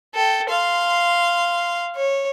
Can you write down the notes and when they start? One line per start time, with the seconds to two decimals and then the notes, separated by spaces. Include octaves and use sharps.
0.14 A4 G5
0.50 F5 C6
1.95 C#5